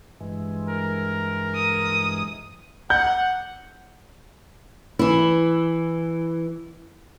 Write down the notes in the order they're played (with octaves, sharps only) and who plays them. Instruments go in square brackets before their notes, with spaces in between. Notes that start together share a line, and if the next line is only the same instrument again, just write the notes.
[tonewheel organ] G2 E3 G#3
[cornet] A#4
[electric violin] D#6
[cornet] F#5 [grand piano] G6
[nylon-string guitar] E3 E4